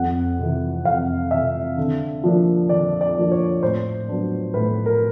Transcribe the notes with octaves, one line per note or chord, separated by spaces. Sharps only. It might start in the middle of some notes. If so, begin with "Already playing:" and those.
Already playing: F2 F#5
C3 E3
F2 F5
C3 E3 E5
D3
F3 A#3 D4
D3 D5
D5
F3 A#3 D4
C#5
A2 C5
F#3 B3 D4
A2 B4
A#4